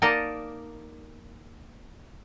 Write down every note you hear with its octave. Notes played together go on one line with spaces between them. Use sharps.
A#3 D#4 A#4 D5 D#5 A5